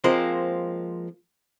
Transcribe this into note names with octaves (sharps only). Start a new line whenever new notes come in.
F3 G#3 A#3 C4